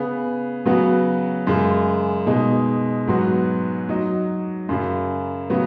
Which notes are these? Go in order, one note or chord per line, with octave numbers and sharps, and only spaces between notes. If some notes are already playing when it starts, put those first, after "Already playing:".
Already playing: C#3 B3 G#4
C#3 F#3 B3 F#4
F#2 C#3 G#3
B2 G#3 D#4
G#2 F#3 B3 F#4
F#3 D#4 F#4
F#2 C#3 F#3
C#3 F#3 B3